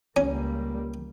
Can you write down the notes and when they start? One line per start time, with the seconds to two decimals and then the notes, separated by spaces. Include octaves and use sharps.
0.17 C#2 G3 A#3 C#4